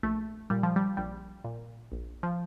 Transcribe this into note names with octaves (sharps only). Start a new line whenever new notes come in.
A#1 A3
A#2 G3
F3
G3
A#1 G3
A#2
A#1
F3